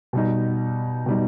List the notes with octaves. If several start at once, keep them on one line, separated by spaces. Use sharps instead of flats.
B2 G3 D#4
B2 G3 D#4